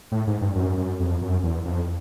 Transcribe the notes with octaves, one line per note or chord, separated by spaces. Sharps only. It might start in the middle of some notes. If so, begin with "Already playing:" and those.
A2
G#2
G2
F#2
F#2
F2
F#2
E2
F2